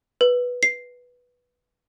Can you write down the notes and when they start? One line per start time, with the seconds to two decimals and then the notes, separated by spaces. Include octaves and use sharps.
0.21 B4
0.63 C7